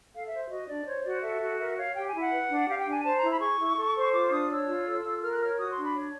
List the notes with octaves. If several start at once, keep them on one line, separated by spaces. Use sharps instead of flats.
A4 F5
E5
C5
F#4 D#5
D4 D5
C5 C#5
F#4 D5
A4 E5
F#4
A#4 E5
C#5 F5
G4 G5
G#5
E4
F#5
B4
D4
G4 F5
G5
D4
G#5
C5 A5
A#5
E4
B5
G#4 C#6
E4
A4
C5
F4 D6
D4 D#6
C#5 E6
F4
A4
F4
A#4 F6
F#6
C#5 F6
F#4 D#6
C6
D4
B5
C#5